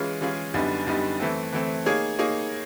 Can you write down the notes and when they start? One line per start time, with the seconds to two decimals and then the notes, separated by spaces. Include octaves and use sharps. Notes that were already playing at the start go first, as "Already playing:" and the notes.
Already playing: E3 G#3 C#4 F4 G#4
0.21 E3 G#3 C#4 F4 G#4
0.54 F#2 D3 G3 B3 D#4
0.87 F#2 D3 G3 B3 D#4
1.20 E3 A3 C4
1.52 E3 A3 C4
1.86 A#3 D#4 G#4 C#5
2.19 A#3 D#4 G#4 C#5